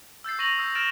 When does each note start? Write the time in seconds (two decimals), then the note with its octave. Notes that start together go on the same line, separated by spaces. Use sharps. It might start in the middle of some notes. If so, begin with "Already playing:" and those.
0.24 E6 G6 A6 C7
0.39 C#6 A#6 D#7 F7 F#7
0.58 D#6 E6 G6 C7
0.75 F6 A6 D7 E7